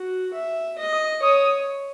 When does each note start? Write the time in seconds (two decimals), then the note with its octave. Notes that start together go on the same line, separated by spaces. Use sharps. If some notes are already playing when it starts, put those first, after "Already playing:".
Already playing: F#4
0.34 E5
0.78 D#5
0.93 D#6
1.22 C#5 D#6